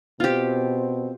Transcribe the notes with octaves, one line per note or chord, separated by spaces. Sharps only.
B2 C4 F4 G4